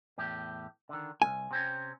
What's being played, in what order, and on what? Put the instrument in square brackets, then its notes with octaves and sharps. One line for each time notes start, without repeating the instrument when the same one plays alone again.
[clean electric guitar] E2 A2 G4
D3 D#3
[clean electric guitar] C2 [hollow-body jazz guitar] G#5
[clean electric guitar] C3 C4 C#4